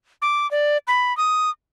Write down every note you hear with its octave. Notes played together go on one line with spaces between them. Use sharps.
D6
D5
B5
D#6